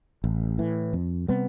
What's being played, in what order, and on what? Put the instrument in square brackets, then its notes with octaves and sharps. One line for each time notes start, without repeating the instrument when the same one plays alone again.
[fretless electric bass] A1
A2 E3
F2
C3 G3 B3